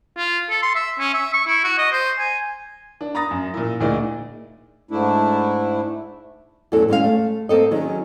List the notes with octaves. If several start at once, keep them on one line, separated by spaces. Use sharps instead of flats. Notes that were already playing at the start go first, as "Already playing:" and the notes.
F4
A4
C6
E5
C#4
E5
C#6
E4
F#4
D#5
C5
G#5
D4
A#5 B5 D#6 A6 A#6
F#2
A#2 E4
D2 A#2 D#4 E4 G#4 D5
G#2 A3 D4 E4
E2 A2 F#3 C#4 A4
D#2 G#3 C#4 C#5 F5
A3
A#3 C4 A4 D#5
D#3 F#3 C#4 G#4